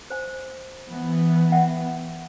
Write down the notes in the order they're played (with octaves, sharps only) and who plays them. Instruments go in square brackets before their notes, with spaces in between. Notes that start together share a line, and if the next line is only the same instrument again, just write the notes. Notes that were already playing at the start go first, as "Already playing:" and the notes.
[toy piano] C5 G#5
[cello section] E3 B3
[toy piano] E5 F#5 G5